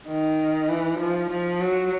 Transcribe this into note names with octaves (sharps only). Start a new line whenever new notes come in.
D#3
E3
F3
F3
F#3